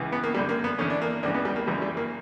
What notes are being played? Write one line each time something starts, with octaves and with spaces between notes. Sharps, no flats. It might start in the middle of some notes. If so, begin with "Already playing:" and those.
Already playing: C#2 C#3 E3
B3
A#3
F#2 D3 G3
A#3
B3
E2 D3 C#4
D4
A#3
C#2 C#3 E3 D4
B3
G3
A#3
F#2 C#3 E3 G3
G3
A#3